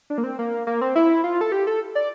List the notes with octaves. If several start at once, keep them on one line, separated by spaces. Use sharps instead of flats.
D4
A#3
C4
A#3
A#3
C4
E4
F4
A4
G4
A4
D5